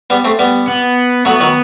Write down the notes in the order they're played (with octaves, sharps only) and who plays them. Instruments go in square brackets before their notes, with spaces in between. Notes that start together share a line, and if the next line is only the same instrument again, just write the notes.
[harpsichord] G3 B3
A3 C4
G3 B3
[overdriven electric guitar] B3
[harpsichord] F#3 A3 [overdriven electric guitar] B3
[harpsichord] D#3 F#3